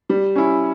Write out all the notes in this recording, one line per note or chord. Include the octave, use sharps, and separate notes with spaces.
G3
C#4 E4